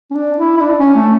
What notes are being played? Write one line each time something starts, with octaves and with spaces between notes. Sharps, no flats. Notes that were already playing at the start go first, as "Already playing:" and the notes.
C#4
D4
E4
E4
D4
C#4
A3